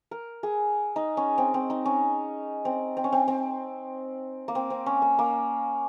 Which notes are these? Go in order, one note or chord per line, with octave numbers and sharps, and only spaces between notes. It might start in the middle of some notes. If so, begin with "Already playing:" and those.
A#4
G#4
D#4
C#4
C4
C4
D#4
C#4
C4
C4
C#4
C4
C4
A#3
C4
C4
C#4
A#3
A#3